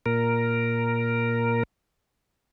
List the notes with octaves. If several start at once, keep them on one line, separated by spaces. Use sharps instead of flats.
A#2 A#4